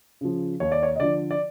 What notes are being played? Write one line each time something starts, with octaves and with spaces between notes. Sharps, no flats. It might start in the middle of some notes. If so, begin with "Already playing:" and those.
C#3 F3
D#2 C#5
D5
C#5
D#5
D3 F3 D5
D5